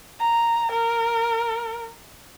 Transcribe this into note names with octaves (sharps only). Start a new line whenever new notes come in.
A#5
A#4